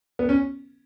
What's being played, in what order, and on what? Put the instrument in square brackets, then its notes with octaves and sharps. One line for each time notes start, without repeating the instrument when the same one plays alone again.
[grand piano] B3
C#4